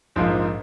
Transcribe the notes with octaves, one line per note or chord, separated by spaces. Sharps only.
A#1 G#2 F3 A#3 F4